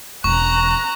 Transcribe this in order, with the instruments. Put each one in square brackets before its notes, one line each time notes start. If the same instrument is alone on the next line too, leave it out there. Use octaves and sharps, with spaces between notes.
[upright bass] E1 E3 [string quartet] A#5 F#6 [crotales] C#6